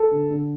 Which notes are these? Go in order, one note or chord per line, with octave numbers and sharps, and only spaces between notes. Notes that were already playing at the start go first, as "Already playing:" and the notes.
Already playing: A4
D3
D3